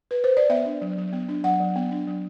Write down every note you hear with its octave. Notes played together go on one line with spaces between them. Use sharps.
B4
C5
D5
B3 E5
D4
F#3
F#3
B3
D4
F#3 F#5
F#3
B3
D4
F#3